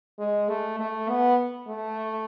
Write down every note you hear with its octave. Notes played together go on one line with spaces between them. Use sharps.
G#3
A3
A3
B3
A3